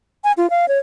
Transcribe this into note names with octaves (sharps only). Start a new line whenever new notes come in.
G#5
F4
F5
C#5